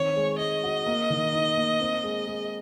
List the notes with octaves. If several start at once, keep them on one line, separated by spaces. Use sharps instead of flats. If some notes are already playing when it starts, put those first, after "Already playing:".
Already playing: D#3 C4 C#5
G#3
G#3 D#5
F#4
A#3
D#3
D#4
A#3
C4
G#3
G#3